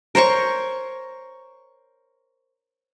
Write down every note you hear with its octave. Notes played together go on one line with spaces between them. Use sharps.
A#4 C5 C#5 C#6